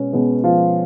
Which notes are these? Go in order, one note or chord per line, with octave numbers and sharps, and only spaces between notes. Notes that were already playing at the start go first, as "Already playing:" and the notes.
Already playing: B2 G#3 B3 C#4
B2 G#3 B3
F3 F4